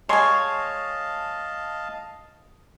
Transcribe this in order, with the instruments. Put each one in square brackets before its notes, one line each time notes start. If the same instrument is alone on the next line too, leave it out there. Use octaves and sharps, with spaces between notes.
[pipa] G#3 C6 [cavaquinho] C#5 G#5 [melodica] D#5 F5 A5